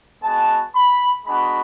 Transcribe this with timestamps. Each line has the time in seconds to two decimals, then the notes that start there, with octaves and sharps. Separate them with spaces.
0.23 G#3 B3 F#4 A5
0.75 B5
1.26 G#3 B3 D4 F#4 B5